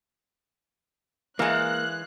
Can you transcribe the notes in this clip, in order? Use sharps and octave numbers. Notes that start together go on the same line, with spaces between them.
E3 G#3 A#3 F5 F#6